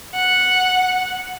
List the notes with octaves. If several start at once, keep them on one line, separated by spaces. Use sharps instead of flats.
F#5